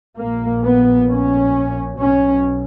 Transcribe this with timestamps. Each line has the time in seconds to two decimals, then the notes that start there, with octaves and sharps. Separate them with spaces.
0.18 A#1 A#2 A#3
0.63 B3
1.10 C#4
2.02 B1 B2 C#4